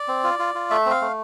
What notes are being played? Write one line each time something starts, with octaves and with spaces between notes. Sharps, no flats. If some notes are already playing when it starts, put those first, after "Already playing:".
Already playing: D5
C4
F4
F4
F4
A3 E5
C4 F5
A3